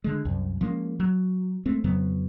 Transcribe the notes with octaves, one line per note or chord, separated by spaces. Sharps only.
D3 G#3
C2 F#2
F3 G#3 A#3 C#4
F#3
G#3 A3 C4
F2 C#3 F#3 B3